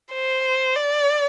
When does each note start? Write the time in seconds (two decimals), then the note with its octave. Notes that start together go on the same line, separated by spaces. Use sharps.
0.13 C5
0.75 D5